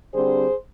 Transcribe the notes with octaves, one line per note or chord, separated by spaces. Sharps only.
D3 G3 C4 G#4 C5